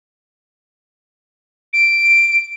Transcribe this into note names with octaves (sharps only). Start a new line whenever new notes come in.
D7